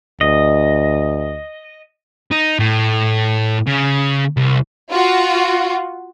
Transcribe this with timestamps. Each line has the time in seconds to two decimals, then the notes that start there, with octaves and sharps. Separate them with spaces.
0.21 D2 D#5
2.31 D#4
2.59 A2
3.67 C#3
4.37 C2
4.91 F4 F#4